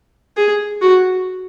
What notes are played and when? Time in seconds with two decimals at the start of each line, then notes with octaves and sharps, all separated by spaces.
0.37 G#4
0.82 F#4